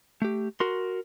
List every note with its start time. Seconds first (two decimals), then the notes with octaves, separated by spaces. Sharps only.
0.22 A3 G4
0.60 F#4 A#4 C6